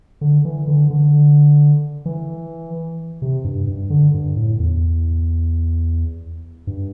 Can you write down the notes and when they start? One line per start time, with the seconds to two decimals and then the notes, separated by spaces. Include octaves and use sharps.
0.21 D3
0.45 E3
0.67 D3
0.90 D3
2.06 E3
3.22 C3
3.44 G2
3.67 G2
3.90 D3
4.14 G2
4.36 A2
4.59 E2
6.67 G2